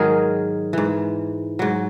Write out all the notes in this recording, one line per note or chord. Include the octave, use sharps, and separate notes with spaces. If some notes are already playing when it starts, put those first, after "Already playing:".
Already playing: G#2 D#3 F#3 G#4 A#4
G#2 E3
G#2 F#3